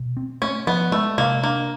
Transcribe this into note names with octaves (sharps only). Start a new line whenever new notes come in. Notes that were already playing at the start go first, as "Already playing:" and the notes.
Already playing: B2
C4
A3 C#4
F3 B3
G#3 A3
C3 A#3
A#3 D4